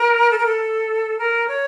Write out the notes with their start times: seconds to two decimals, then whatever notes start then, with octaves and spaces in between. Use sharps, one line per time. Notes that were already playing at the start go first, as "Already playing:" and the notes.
Already playing: A#4
0.30 A4
0.38 A#4
0.46 A4
1.19 A#4
1.48 C#5